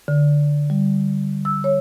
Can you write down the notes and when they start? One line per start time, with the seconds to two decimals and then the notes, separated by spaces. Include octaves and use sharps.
0.08 D3
0.70 G3
1.45 E6
1.64 C#5